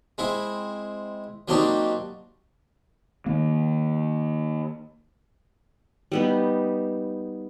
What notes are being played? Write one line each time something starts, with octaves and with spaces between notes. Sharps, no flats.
G#3 C4 E4
F#3 A#3 C4 D4 D#4 G4
D#3 A#3
G3 B3 D#4